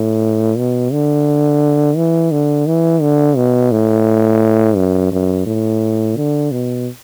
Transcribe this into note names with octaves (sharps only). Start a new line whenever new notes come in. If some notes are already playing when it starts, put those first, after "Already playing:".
Already playing: A2
B2
D3
E3
D3
E3
D3
B2
A2
F#2
F#2
A2
D3
B2